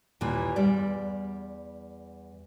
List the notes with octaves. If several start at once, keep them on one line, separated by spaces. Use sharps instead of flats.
D#2 A#2 E3
E2 G3 D5